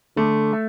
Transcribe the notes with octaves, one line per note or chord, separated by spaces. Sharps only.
D3 A3
A3